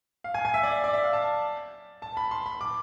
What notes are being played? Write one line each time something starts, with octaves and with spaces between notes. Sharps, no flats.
F5
G#5
G#5
E5
D5
E5
D5
E5
F5
A5
A5
B5
C6
B5
D6